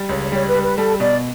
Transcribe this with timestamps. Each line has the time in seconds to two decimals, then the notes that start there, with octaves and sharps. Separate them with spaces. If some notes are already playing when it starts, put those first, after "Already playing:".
Already playing: G3
0.09 C#2 C#5
0.32 G3 C#5
0.47 B4
0.55 G3
0.63 B4
0.77 G3 A4
1.00 B2 D5